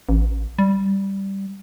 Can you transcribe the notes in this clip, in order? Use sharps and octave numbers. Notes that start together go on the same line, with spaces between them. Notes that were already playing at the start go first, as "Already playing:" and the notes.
A1
G3